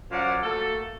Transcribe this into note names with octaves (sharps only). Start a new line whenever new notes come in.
F#2 F3 F#3 F4 D5 F#5
A3 A#3 F#4 A4